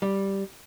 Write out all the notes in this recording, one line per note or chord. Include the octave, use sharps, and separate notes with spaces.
G3